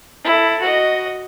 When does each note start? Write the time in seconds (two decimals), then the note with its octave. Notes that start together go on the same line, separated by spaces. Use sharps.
0.24 E4 A4
0.61 F#4 D#5